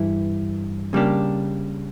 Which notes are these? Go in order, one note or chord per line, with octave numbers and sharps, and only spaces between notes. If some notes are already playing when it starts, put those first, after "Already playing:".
Already playing: G2 E3 E4
C#3 G3 A#3 D4 G4